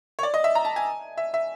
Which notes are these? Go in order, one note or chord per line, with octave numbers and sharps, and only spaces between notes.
C#5
D5
D#5
E5
A#5
A5
G#5
E5
E5